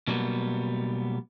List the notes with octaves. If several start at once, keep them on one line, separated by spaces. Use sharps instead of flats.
B2 F#3 G3 A#3 B3